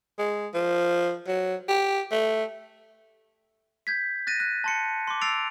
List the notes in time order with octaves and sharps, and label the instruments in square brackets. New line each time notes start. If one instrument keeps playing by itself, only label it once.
[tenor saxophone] G#3
F3
F#3
G4
A3
[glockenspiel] G6 G#6 B6
F#6 A6 A#6 D#7
F#6
A5 C6 C#7
C6 D6
E6 A6 C7 D7 F7